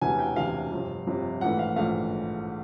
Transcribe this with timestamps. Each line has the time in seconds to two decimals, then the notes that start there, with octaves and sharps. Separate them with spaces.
0.01 E1 D2 C3 E3 G#5
0.19 G5
0.36 E1 D2 C3 E3 F5
0.72 G1 F2 C3
1.07 G1 F2 C3
1.41 A#1 G#2 E3 A3 F#5
1.59 F5
1.76 A#1 G#2 E3 A3 F5